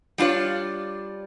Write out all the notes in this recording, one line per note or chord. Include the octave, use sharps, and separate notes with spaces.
G3 D4 F4 C#5